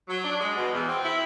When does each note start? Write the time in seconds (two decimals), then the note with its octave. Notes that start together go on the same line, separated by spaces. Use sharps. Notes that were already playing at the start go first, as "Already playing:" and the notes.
0.09 F#3
0.24 D4
0.40 G#3
0.56 B2
0.72 E2
0.88 C4
1.04 E4